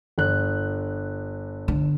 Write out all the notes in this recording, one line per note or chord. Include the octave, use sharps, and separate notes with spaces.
G1 F#6
D3